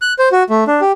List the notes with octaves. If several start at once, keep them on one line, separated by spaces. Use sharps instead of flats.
F#6
C5
F#4
A3
D4
G4